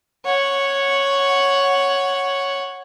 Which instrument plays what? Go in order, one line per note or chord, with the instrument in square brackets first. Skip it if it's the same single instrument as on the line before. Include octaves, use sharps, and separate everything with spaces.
[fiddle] C#5 F#5